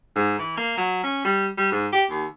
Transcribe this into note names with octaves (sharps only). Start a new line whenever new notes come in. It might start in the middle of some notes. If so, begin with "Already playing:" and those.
G#2
E3
A#3
F#3
C#4
G3
G3
G#2
G4
D#2